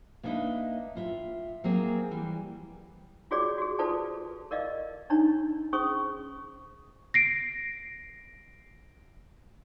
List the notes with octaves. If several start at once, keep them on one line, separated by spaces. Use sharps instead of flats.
A#3 B3 D4 D#4 B4 E5
A2 F4 E5
F#3 A#3 C4 G#4
E3 G3
F4 F#4 G#4 C#5 D5 D6
F#4 G#4
F4 A4 B4 C5 D5 A5
A#4 D5 D#5 F5
D4 D#4 C#5 A#5
C#4 G#4 C5 C#6 D#6
A#6 C7 D7